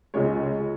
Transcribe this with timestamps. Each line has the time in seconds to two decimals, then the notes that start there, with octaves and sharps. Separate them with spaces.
0.14 C#2 C#3 G#3 C#5